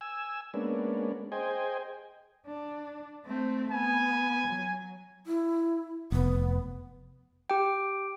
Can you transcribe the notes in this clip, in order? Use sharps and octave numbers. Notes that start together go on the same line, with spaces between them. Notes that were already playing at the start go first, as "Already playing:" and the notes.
G#5 E6
G#3 A#3 B3 C#4 D4
G#4 C5 D#5 G5 G#5
D4
A3 C4
B3 G#5
F#3
E4
F1 B3
G4 G5